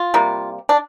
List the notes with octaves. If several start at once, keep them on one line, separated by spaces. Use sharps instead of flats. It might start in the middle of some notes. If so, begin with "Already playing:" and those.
Already playing: F4
C3 G3 A#3
D4